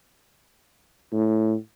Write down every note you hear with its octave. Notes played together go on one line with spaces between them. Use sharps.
A2